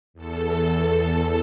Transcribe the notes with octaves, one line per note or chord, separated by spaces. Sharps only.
E2 A4